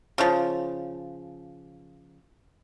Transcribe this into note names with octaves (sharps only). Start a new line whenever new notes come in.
C#3 F3